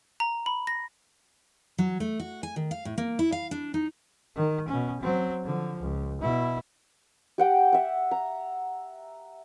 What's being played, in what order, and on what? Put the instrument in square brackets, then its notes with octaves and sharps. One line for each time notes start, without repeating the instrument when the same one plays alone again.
[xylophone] A#5
B5
A#6
[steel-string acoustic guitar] F#3
A3
F#4
G#5
D#3
F5
A2
A#3
E4
F5
D4
D#4
[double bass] D#3
B2 C#4
F#3 C4
D3 F3
C#2
B2 E4
[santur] G4 F#5 G5
E5 F#5
A#5